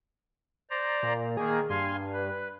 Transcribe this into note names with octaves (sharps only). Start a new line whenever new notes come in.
C5 D5 A#5
A#2
D#3 A#3 G#4
G2 F5 G#5 C6
B4